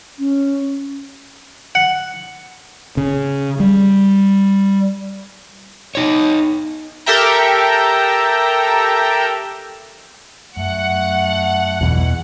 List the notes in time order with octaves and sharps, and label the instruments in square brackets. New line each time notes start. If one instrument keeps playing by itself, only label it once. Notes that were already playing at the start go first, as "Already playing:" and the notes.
[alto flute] C#4
[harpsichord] F#5
[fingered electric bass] C#3
G3
[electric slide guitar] D#4 C#5
[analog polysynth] G4 A4 A#4 E5 G5 A#5
[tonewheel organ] F#2 [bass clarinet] A3 [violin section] F#5
[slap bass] E2 B2 [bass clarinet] E3